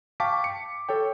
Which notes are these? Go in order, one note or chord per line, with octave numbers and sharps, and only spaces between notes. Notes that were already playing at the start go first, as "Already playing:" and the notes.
F5 G5 A5 C#6 D6 B6
C#7
A4 C#5 G5